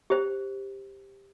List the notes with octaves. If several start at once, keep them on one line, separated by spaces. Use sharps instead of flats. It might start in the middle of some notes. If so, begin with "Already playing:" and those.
G4 C5